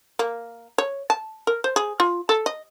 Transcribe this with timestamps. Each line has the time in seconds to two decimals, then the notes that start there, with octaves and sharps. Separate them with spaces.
0.19 A#3
0.78 C#5
1.10 A5
1.47 A#4
1.64 C5
1.76 G#4
2.00 F4
2.29 A4
2.46 D#5